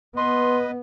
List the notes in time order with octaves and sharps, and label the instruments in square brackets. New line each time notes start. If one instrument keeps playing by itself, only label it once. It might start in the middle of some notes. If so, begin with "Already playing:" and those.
[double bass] B3 [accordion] B4 D#5 [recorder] C6